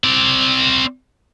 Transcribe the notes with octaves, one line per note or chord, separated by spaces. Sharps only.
C4 D5